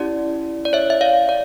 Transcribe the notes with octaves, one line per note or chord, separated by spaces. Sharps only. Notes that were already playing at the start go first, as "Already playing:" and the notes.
Already playing: C#4 E4 G4 D5
D5
C#5 E5
E5
D5 F5
D5